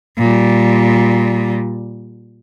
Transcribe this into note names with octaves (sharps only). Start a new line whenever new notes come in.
A#2 G3